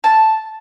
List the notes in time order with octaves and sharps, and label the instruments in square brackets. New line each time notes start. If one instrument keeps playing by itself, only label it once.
[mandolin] A5